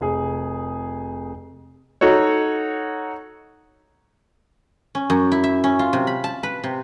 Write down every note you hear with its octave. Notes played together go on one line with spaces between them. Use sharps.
F1 G#4
D#4 F#4 A4 C#5
C#4
F#2
E4
E5
C#4
F4
C3
B5
A5
B4
C3